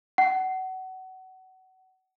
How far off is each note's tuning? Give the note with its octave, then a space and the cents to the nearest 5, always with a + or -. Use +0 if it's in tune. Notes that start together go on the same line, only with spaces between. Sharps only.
F#5 +25